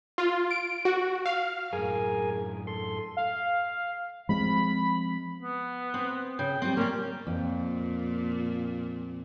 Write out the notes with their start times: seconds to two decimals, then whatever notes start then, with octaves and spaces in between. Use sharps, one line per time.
0.18 F4
0.51 D7
0.85 F#4
1.26 F5
1.73 F#2 A2 G#4 A#4 G#5
2.67 A4 C6
3.17 F5
4.29 F3 G#3 C4 B5
5.42 B3
5.94 C4
6.39 C#3 G5
6.62 G3 C4
6.77 A#3 C#4 D5
7.27 F2 A#2